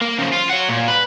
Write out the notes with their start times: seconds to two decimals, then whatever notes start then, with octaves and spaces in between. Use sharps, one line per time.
0.02 A#3
0.19 C#3 F3
0.33 F4
0.50 C#5 F#5
0.69 A#2
0.88 B4